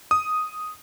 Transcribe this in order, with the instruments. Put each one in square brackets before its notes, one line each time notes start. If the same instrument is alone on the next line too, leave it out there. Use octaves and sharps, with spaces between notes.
[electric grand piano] D#6